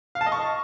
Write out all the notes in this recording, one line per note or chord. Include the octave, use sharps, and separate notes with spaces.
F5
A5
D#5
C#6